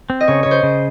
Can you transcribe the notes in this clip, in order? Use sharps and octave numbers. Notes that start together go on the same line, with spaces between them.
C4
D#5
C#3 C#5
C#3 C#5
C5
C#3